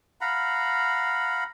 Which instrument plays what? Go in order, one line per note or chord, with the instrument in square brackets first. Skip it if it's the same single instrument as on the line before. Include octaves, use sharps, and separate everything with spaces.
[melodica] F5 F#5 A#5 B5